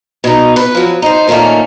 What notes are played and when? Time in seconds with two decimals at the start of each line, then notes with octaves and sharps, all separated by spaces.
0.24 B2 D#4
0.56 B4
0.75 F3 F#3
1.02 D#4 C5
1.28 A#2 D#3 A3 A#3 C#4